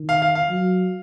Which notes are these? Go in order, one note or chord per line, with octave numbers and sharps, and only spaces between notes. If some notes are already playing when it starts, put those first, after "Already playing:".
Already playing: D#3
F5
F5
F5
F#3